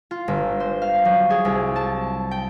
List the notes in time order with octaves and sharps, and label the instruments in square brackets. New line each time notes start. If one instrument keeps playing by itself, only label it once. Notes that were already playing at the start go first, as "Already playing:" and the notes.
[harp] F4
G1
C5
F5
F#3
G#4
C2
A5
G5